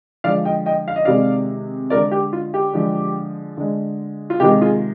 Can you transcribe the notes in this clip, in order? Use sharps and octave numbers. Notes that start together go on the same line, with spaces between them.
D3 F3 G#3 D5 F5
D#5 G5
D#5 G5
F5
D#5
C3 D#3 G#3 D5 F5
D3 G#3 A#4 D5
G4
F4
G4
D3 F3 G#3
D3 G#3
F4
C3 D#3 G#3 G4
F4 G#4